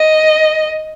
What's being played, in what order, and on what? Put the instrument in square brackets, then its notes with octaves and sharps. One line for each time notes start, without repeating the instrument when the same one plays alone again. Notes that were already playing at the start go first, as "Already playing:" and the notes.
Already playing: [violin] D#5